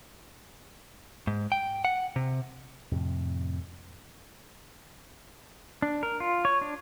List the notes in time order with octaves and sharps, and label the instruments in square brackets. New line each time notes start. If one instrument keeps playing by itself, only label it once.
[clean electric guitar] G#2
G5
F#5
C3
[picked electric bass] F2 A2 C3
[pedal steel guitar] D4
A#4
F4
C#5
D4